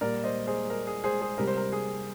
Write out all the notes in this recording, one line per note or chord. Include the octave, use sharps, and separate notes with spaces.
A#2 G3 A#4 D5
C5 D#5
G#4 C5
A#4
G#4
G#4 C5
G#4 C5
C3 G3 A#4
C5
A#4
G#4